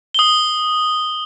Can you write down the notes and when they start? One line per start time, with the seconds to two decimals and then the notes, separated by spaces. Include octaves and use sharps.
0.14 D#6 G7